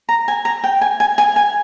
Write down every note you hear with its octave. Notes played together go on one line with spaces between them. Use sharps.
A#5
G#5
A#5
G5
G#5
G#5
G#5
G#5